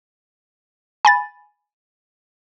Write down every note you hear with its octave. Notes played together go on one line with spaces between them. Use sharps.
G#5 B5 A6